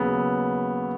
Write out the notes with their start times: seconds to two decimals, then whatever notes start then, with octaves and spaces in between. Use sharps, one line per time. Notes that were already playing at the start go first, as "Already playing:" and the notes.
Already playing: D#2 C#3 F#3 B3